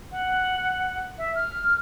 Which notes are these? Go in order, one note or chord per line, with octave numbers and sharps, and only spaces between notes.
F#5
E5
F6